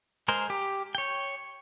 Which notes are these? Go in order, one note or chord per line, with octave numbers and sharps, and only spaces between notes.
G#3 G#4 A#4 C5
G4
C#5 G5